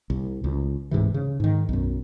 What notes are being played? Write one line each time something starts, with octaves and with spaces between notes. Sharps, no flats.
C2
C#2
D1 G#2 C3 E3
C#3
G#2 D#3
B1 F#2